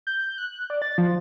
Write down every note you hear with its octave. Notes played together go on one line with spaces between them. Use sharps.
G6
F#6
D5
A6
F3